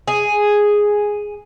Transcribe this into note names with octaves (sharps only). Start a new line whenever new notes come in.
G#4